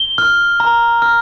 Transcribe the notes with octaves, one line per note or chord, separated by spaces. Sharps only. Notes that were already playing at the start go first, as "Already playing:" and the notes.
Already playing: G7
F6
A#5
F6